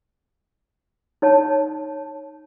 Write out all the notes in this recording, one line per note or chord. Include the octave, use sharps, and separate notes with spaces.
D#4 C#5 A5